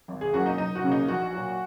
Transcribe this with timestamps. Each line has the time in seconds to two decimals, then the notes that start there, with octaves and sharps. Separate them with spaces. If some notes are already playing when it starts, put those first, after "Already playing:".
0.08 G#1
0.21 G#4
0.33 F#2 F#3 A#3 F#4
0.46 D#4
0.58 F#1 D#4
0.75 F#4
0.83 F#2 C#3 A#3
0.92 D#4
1.08 A#1 F#4
1.33 A#2 F#3